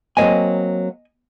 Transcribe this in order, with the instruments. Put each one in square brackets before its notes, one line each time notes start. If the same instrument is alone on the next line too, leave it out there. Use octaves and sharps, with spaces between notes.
[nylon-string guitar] F#3 A#3 C4 [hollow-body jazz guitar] D#5 G#5